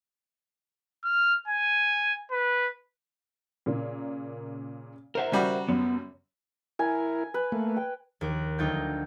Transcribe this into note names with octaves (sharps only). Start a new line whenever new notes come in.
F6
G#5
B4
A#2 C#3 A#3
A#4 C5 E5 F#5 A#5
C#3 G3 F#4
F#2 B3
E4 A#4 G#5
B4
A3 A#3
G5
D#2 A#4 F#6
D2 F#3 D#4 F4 G5 G6